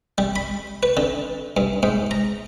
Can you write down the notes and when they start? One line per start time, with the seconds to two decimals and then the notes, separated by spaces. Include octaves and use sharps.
0.18 G3
0.36 B5
0.83 B4
0.97 D3
1.57 G2
1.83 G#2
2.11 A#5